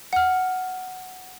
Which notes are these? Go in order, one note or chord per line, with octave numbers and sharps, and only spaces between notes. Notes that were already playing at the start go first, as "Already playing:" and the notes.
F#5 F6